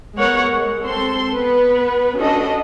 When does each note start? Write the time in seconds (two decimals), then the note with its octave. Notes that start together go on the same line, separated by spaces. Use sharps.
0.15 G#3 B3 A#4 C#5 F#5
0.50 G#3
0.82 C4 A4 C6
1.34 B3 B4
2.18 C#4 D4 F#4 A4 D#5